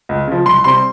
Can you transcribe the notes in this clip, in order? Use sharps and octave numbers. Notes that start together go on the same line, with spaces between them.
C#2
C#3 F3
C2 C6
C3 G3 C4 C6